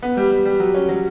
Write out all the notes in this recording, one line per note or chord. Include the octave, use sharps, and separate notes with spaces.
B3
G3
G3
G3
F#3
C#4
F#3